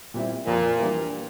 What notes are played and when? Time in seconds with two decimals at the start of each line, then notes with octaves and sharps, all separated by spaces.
0.14 A#2 G3 C4 E4
0.47 F2 A#2
0.79 E3 G3 A#3 D4